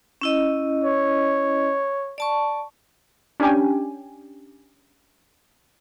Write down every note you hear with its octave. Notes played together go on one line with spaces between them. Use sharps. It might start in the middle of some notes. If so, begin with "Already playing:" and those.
C#4 E4 D#5
C#5
D5 A5 C#6
C#4 D4 G4 G5 G#5